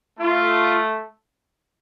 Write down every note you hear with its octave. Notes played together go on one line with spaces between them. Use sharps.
A3 F4